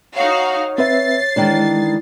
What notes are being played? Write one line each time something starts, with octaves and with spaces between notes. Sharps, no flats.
D#4 F#4 C#5 F5
C4 B4 E5 A6 C7
D#3 E3 G#3 D4